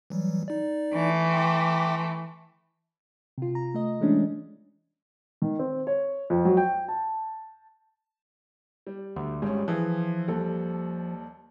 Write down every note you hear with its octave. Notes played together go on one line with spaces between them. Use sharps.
E3 F#3 G3
D#4 D5
E3 A3
G5 C6 D6
C3 F4
A#5
A3 D#5
E3 G#3 A3 C#4 D4
D#3
C4
C#5
F2
F#3
G5
A5
G3
D2
G#1 G3 G#3 C#4
E3 F3 G#4
D#2 G3 A4